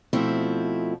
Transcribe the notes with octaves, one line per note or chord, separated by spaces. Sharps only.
B2 F3 A3 C4 E4